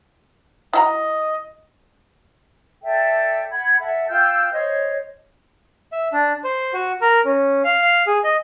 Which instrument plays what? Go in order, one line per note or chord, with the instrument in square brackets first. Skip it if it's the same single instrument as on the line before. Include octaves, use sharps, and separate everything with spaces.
[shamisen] E4 F#4 A#5 [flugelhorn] D#5
[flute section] A4 D5 E5 G5
F#5 B5 G#6
A4 E5 F#5
F4 G5 E6 G6
C5 C#5 D#5
[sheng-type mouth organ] E5
D4
C5
F#4
A#4
C#4
F5
F5
G#4
D#5